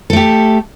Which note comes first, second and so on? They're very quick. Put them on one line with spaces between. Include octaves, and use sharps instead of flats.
A4 A3 G4